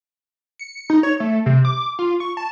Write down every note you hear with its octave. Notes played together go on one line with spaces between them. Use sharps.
C#7
D#4
C#5
A3
C3
D6
F4
C#6
A5